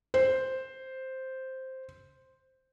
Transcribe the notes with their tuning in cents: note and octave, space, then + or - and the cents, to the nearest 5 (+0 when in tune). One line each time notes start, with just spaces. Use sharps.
C5 +0